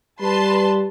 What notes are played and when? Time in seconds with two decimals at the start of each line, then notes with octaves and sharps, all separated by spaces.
0.22 G3 B4 A5 C6